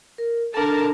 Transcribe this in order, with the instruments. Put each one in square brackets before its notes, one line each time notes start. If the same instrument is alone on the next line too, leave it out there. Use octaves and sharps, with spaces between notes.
[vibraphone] A#4
[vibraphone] D4 A4 [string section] A#4 A5